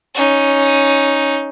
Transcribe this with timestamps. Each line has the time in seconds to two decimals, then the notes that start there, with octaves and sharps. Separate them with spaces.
0.15 C#4 D#4